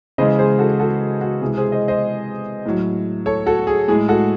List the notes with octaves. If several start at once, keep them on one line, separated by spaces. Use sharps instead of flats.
C#3 E3 G#3 C5 D#5
G#4 C5
F#4 A4
F#4 A4
F#4
C3 E3 G#3 G#4
G#4 C5
C5 D#5
C5 D#5
A2 F#3
A4 C#5
F#4 A4
G#4
A2 G#3 G#4
F#4 A4